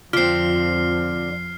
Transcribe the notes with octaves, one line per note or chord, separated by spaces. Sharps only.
F2 D3 F3 C4 F4 F6 C7